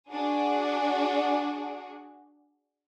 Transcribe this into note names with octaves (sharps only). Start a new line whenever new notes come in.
D4 F#4 G#4